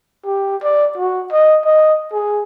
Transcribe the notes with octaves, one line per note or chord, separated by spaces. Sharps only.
G4
D5
F#4
D#5
D#5
G#4